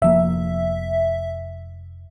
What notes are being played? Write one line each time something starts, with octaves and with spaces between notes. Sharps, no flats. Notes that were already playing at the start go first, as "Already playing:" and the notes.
F1 F3 A#3 E5